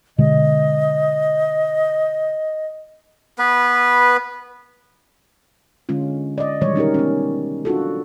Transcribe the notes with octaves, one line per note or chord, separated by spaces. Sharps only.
B2 D3 G#3 D#5
B3 B4
D3 G#3 C#4 F4
D5 D#5
B2 D#3 E3 G3 G#3 C#5
C#4 D#4 G4 A#4
B3 C#4
D4 F4 F#4 A4